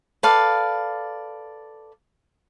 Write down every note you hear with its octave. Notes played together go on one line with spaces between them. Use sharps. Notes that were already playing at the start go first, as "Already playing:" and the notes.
A4 B4 D5 F5